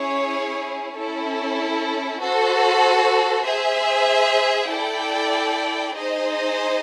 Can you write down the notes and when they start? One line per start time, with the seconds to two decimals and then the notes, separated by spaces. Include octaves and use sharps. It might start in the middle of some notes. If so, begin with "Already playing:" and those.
Already playing: C#4 E4 G#4 C#5
0.95 C#4 E4 A4
2.20 F#4 A4 C5
3.44 G#4 C5 E5
4.69 E4 A4 D5 G5
5.94 D#4 G#4 C5 D#5